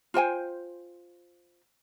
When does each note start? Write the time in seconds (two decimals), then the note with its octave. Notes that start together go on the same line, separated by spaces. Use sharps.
0.14 F4 C5 G5 G#5